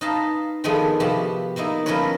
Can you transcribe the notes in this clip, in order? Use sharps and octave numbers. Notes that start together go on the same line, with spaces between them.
D#4 B4 D#5 F5 A5
D#3 F3 G#3 A3 B3 D4
C3 F3 B3 F#4 G4
A#3 B3 D#4 E4
F3 C#4 E4 A#4 B4 C#5